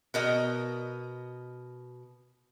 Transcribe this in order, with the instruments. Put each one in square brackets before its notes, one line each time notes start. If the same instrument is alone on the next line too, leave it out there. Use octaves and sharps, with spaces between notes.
[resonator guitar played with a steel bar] B2 A#4 D#5